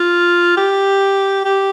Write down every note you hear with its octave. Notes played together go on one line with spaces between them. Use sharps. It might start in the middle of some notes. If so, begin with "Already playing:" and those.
Already playing: F4
G4
G4